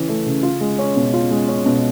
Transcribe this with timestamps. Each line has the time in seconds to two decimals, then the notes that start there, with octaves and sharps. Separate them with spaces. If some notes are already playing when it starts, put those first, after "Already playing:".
Already playing: C#3 E3 C#4
0.09 A3
0.26 C#3
0.43 F4
0.61 G#3
0.79 C#4
0.96 B2
1.14 F4
1.31 G#3
1.48 C#4
1.66 B2